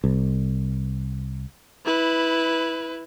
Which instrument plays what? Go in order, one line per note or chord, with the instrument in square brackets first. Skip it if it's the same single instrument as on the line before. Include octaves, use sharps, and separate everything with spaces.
[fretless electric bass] C2
[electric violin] E4 B4